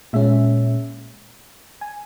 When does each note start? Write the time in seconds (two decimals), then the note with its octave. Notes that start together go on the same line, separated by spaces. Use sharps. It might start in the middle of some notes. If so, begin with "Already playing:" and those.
0.13 A#2 G#3 C#4 E5
1.81 G#5